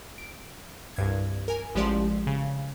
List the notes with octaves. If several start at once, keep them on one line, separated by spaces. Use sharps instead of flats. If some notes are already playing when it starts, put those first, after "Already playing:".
D7
C2 G2 G#6
A#4 G#5
A1 F3 G#3 G4 D5 C6
C#3